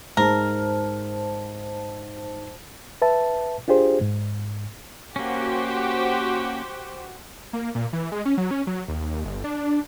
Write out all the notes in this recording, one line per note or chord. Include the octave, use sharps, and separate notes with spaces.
G#2 A#4 C5 A5
B4 E5 A5
D4 F4 G4 G#4 C5
G#2
A#3 C#4 F#4 G4 C5
A#3
A#2
E3
G#3
C#4
F#3
C#4
F#3
D#2
G1
D4